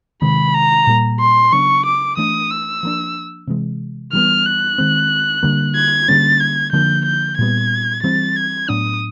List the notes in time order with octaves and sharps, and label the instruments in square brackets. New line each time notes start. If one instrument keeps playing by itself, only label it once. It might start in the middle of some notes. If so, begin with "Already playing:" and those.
[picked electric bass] C3 D#3 G#3 [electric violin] B5
[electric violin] A#5
[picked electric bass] A#2 G3 A#3
[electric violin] C6
[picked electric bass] C#3 F#3 B3 D4 [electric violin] C#6
[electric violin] D6
[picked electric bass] E3 A3 D4 [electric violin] D#6
[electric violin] E6
[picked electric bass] F3 A#3 D4
C3 E3 G#3
[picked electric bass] E3 G3 B3 [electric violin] F6
[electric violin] F#6
[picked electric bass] D#3 G#3 C4
D3 G3 A#3 D4
[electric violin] G#6
[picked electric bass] D3 G3 A#3 C#4 [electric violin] A6
[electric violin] G#6
[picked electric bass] D3 F3 A#3 D4 [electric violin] G6
[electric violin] G6
[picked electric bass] A#2 G3 B3 [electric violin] G#6
[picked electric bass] E3 G3 C4 [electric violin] A6
[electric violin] G#6
[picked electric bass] A2 F#3 B3 D4 [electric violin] D#6